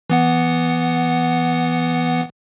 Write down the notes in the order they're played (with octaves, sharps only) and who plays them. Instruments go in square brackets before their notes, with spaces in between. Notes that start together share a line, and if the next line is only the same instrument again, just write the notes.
[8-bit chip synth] E3 B3 F#5